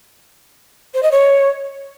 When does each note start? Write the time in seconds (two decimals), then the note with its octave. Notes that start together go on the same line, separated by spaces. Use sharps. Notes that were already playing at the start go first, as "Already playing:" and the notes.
0.94 C5
1.03 D#5
1.12 C#5